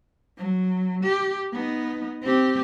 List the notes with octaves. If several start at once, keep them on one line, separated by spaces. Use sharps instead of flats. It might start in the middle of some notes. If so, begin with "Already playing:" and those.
F#3
G4
B3 D#4
C4 G4